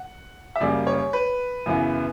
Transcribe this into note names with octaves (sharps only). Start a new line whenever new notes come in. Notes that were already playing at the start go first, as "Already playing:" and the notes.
Already playing: F#5
E5
F#2 C#3 G3 A#3 D5
C#5
B4
F#2 C#3 E3 B3